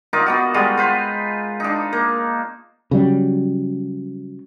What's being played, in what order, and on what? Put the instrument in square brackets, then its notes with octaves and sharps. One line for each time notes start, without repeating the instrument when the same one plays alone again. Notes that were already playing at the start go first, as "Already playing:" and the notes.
[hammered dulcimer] D#4 F4 A#4 D5
B3 D#4 F#4
G3 G#3 F4 F#4
F4 B4 C5
D4 D#4
A#3
[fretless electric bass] C#3 F#3 G3